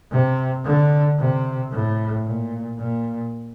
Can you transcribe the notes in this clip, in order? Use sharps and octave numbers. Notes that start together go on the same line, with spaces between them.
C3
D3
C3
A2
A#2
A#2